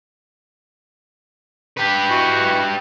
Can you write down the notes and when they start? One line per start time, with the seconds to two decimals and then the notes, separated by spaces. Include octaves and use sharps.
1.77 G4 B4
2.08 B2 E3 F#4